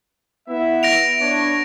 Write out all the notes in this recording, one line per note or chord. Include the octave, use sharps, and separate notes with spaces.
B3 E4 E5
A#6 D7 F7
B3 D4 C#5